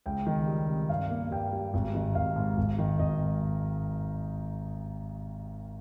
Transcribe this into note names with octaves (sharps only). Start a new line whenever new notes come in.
C#2 G5
D#3
G3
C3
G2 F5
A#3
G2 G5
G3
G#1
D#3
G#1 F5
G#2
G#1
D#3
G#1 D#5
G#2